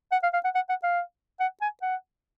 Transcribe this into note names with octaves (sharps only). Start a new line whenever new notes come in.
F#5
F5
F5
F#5
F#5
F#5
F5
F#5
G#5
F#5